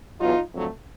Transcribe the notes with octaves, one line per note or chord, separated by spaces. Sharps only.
E2 B2 F#3 D#4 F4
F2 D3 F#3 A3